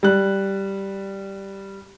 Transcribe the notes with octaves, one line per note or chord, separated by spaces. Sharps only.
G3 F#6